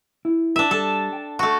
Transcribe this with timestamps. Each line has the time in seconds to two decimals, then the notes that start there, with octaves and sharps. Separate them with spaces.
0.25 E4
0.56 D4 E5
0.71 G3 A4
1.13 G5
1.39 A3 F#4